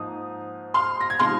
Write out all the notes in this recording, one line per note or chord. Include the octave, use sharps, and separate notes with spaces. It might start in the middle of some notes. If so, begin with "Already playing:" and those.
Already playing: G#2 F3 A#3 D#4 D#6
C6 F6
A#6
G#6
C3 F3 G#3 D#4 C6 F6